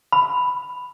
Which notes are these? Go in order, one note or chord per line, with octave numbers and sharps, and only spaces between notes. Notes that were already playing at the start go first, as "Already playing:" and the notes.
B5